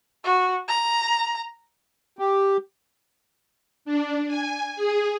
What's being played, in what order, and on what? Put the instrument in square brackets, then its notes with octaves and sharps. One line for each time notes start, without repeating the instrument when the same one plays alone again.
[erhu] F#4
A#5
[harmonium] G4
[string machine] D4
G#5
G#4